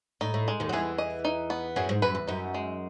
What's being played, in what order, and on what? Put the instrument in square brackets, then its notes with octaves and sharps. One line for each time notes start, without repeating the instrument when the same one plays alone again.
[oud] A2 [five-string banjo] D#4
[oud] A2
[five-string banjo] G#3
[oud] D#2 D#3
F#3
[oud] E2 E3 [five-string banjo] G#4
[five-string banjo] D#5
D#4
B3
[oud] F#2 F#3 [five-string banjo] G#4
[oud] G#2
[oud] F#2 [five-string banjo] B4
[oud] E2
[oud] F#2 [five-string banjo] D#4
[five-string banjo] G#3